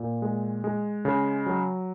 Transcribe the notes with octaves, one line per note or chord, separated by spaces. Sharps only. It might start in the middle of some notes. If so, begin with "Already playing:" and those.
Already playing: A#2
G#3
G#3
C#3
F#3